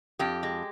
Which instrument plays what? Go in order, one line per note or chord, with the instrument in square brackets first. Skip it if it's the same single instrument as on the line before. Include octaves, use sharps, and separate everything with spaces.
[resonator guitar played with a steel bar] F2 G4
G#3